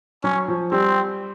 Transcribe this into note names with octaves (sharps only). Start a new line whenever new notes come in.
F#3 C#4
F3
G3 C4